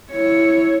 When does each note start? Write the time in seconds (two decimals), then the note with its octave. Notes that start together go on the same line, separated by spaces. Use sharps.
0.11 E4 C#5